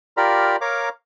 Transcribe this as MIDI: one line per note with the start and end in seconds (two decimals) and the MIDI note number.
0.17 0.56 65
0.17 0.56 67
0.17 0.56 70
0.17 0.56 74
0.17 0.56 82
0.17 0.56 83
0.61 0.89 70
0.61 0.89 73
0.61 0.89 77
0.61 0.89 82
0.61 0.89 86